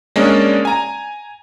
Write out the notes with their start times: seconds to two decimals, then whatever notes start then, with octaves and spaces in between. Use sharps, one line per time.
0.16 G#3 A#3 C#4 D4 D5 D#5
0.65 G#5 A#5